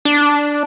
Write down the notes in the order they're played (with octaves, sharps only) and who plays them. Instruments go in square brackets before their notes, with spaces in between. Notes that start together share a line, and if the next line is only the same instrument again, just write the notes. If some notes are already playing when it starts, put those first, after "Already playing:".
[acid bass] D4